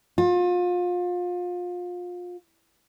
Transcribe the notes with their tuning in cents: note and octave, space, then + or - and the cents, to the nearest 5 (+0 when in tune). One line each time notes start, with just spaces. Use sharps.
F4 +30